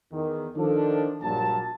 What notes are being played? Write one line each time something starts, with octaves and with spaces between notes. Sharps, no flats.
E2 D#3
D#3 F3 D4 A4
A#1 G2 A#2 F#3 A5